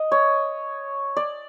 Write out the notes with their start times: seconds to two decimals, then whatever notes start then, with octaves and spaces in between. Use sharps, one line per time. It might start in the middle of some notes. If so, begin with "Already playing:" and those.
Already playing: D#5
0.12 C#5
1.17 D5